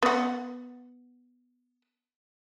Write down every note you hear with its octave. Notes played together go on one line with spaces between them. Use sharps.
B3 F#5